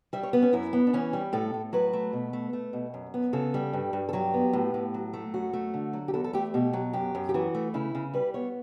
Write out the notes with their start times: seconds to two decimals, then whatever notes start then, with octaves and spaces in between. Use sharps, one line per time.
0.13 G3 E5
0.23 C#5
0.33 B3 B4
0.43 C#4
0.53 F#2 E4
0.73 B3
0.87 D4
0.93 E3 C#4
1.13 G3
1.33 A2 A4
1.54 A2
1.73 F#3 B4
1.93 A3
2.13 B2
2.33 A3
2.53 A3
2.73 B2
2.94 F#2
3.14 B3
3.33 C#3 A4
3.54 G3
3.73 G2
3.93 G2
4.09 A4
4.13 F#3 G4
4.34 B3
4.53 A2
4.74 A2
4.94 F#3
5.13 A3
5.34 F#2 F#4
5.53 A3
5.74 D3
5.93 F#3
6.08 G4
6.14 E2 A4
6.24 A4
6.33 A3 G4
6.54 B2 G4
6.73 F#3
6.93 F#2 G4
7.15 F#2
7.29 G4
7.34 E3 F#4
7.55 A3
7.74 C#3 E4
7.95 C#3
8.14 G3 B4
8.34 B3 C#5